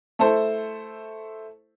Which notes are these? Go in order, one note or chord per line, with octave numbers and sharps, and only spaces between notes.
A3 E4 A4 C5